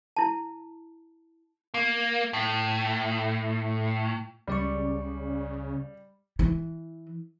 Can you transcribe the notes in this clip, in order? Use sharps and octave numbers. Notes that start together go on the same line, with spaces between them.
E4 A5
A#3
A2
C#2 C#3 G3 D5 C#6
E3